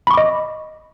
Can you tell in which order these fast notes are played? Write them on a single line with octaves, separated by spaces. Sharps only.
B5 C#6 D6 D#5